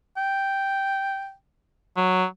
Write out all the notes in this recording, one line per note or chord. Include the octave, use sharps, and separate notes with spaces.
G5
F#3